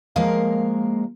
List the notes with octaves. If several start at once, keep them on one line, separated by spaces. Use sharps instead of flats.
F3 G#3 A#3 A#4 F5